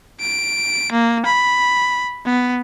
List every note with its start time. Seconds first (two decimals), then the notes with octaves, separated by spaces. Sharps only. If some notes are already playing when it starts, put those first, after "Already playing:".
0.21 D7
0.92 A#3
1.26 B5
2.26 B3